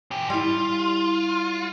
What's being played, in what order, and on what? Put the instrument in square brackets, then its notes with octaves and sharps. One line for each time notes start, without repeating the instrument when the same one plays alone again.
[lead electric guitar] C#4 G4
[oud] G3 E4 [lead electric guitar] F4